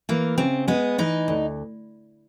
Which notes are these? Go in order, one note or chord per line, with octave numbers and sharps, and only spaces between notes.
E3 A#3
C#3 C4
G#3 B3
E3 D#4
D2